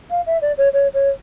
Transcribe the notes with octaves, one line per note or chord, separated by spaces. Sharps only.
F5
E5
D5
C#5
C#5
C#5